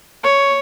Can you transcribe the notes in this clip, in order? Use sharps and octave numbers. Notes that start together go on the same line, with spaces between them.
C#5